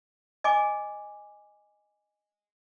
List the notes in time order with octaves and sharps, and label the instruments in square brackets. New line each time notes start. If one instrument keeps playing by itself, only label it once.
[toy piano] D#5 G#5 D6